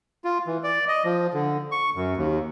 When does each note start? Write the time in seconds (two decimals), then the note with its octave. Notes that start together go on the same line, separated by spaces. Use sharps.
0.24 F4
0.47 E3
0.63 D5
0.88 D#5
1.04 F3
1.34 D3
1.71 C#6
1.95 F#2
2.17 D#2